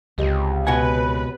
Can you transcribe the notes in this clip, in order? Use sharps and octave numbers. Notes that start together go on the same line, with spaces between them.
C#2 C3 G4 D#5
B2 B4 F#5 G#5